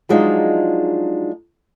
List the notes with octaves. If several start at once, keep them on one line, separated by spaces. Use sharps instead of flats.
F3 F#3 G#3 D4 D#4 F4